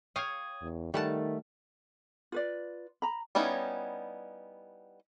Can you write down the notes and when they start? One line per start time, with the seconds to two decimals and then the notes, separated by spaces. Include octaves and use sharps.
0.16 C#5 F5 G5 D#6 G#6
0.62 E2
0.94 D#3 G3 A3 F#5 A5
2.32 F4 B4 D5
3.02 A#5 B5
3.35 G3 B3 C#4 D#4 E4